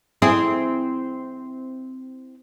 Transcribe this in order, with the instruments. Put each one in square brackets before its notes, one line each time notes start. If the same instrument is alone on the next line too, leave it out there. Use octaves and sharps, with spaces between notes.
[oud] C4 E4 G#4